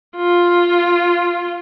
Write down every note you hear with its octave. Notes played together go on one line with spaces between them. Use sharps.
F4